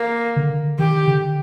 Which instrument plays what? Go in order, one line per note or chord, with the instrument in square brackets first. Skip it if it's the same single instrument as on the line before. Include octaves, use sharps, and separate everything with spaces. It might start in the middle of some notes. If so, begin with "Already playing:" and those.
Already playing: [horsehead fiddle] A#3
[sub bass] D3
[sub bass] D#3 [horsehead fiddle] G4
[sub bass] D3